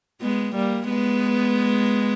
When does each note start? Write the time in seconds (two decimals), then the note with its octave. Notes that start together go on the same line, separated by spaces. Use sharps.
0.22 G#3 B3
0.55 G3 A#3
0.90 G#3 B3